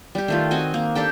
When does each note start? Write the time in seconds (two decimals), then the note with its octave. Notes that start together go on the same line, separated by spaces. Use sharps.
0.15 G3 G4
0.28 D#3 A3 F4
0.51 C4 F#4 D#5 G#5
0.74 A#3
0.95 D4 G4 A4 G5